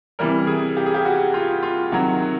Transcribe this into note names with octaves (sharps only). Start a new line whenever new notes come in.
C3 E3 G3 A#4
G#4
G4
G#4
G4
F#4
F4
F4
C3 D#3 F#3 F#4